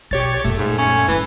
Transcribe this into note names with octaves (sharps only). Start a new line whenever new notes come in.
B1 G4 C#5 A6
F#2 A#2 A3
G#2
C#4
G2 E3